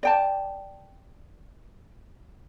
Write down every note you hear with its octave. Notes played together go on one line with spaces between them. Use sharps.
D5 G5 A5